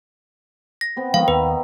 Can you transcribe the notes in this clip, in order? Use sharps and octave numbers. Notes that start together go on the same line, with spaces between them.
A#6
B3 C4
D#3 F3 G#3 B3 D#5 F5
D#2 B4 B5